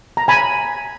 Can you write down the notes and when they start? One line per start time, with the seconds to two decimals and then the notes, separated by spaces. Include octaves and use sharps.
0.17 A#5
0.28 G#5 B5